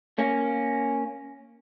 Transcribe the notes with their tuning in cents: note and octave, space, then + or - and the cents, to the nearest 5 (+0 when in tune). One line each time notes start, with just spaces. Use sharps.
A#3 +0 C#4 +0